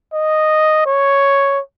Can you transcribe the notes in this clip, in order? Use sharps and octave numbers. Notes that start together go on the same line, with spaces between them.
D#5
C#5